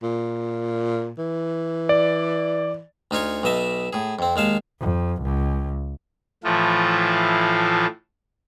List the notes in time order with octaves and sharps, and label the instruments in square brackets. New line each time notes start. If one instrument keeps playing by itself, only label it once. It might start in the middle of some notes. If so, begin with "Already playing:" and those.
[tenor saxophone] A#2
E3
[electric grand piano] D5
[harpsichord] D2 D#4 F4 C#5 C#6
B1 B2 D#5 E5 A5
A2 G#4
F2 C4
D#2 G#3 F5 A5
[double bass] F2
C#2
[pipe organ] A2 E3 F3 A3 F4